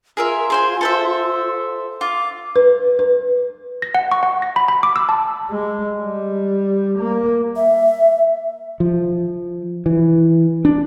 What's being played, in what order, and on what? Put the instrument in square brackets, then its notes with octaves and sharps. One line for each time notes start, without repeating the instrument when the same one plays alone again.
[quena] F4 [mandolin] G#4 A#4 E5
[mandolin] G#4 C5 G#5
A4 C5 E5
[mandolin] F4 [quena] D6
[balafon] B4
B4
[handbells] A#6
F#5
C#6
F#5
A#6
B5
B5
D6
E6
A5
[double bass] G#3
G3
A#3
[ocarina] E5
[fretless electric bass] F3
E3
D4